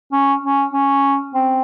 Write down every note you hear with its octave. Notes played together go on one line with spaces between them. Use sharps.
C#4
C#4
C#4
C4